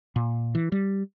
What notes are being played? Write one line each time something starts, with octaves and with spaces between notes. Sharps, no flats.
A#2
E3
G3